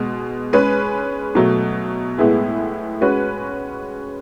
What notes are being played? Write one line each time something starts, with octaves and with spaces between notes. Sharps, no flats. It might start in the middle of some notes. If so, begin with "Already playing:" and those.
Already playing: B2 G#3 B3
G#3 C#4 G#4 B4
B2 F#3 A3
A2 G#3 B3 E4 G#4
G#3 C#4 F#4 B4